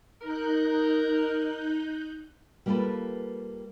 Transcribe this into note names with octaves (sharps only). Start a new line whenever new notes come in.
D#4 A#4 F#6 G6
G3 A#3 B3 F4 A4 B4